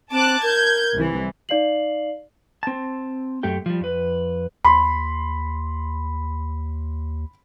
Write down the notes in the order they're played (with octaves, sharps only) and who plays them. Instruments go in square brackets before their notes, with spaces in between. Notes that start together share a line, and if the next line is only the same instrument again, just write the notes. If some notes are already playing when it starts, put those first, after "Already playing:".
[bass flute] C4 [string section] A5 D6 F#6
[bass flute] A#4 [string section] G6 G#6
[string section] C2 E3
[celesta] D#4 D5 F5 C7 F#7
[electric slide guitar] C4 A5
F#2 A3 G4 G5
F3 G3
F2 B4
[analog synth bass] D#2 [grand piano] B5 C6